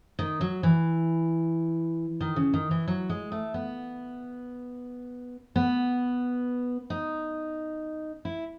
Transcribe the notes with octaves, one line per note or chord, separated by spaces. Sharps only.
D#3
F#3
E3
D#3
C#3
D#3
E3
F#3
G#3
A3
B3
B3
D#4
E4